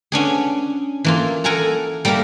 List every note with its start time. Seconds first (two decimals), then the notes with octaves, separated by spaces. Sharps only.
0.12 B3 C#4 D4 G#4
1.04 E3 A#3 F4
1.44 A4 A#4 F#5 G#5 A#5
2.05 G3 A#3 A4 A#4 E5 F5